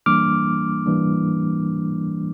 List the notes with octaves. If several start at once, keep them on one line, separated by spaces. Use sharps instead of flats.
E3 G3 A#3 D4 D6 F6
E3 G3 A#3 D4